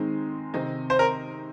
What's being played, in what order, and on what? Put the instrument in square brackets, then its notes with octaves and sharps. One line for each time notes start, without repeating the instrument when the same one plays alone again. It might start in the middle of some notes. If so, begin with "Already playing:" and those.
Already playing: [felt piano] D#3 G#3 C4 D#4
C3 D#3 C4 D#4
[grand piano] C5
A#4